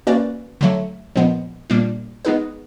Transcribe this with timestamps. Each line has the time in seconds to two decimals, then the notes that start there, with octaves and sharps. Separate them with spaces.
0.07 A#3 C#4 F#4 B4 D5
0.61 D3 F#3 A3
1.16 A#2 F3 G#3 B3
1.70 A#2 G3 A#3 D4
2.25 G#3 B3 D#4 G#4 B4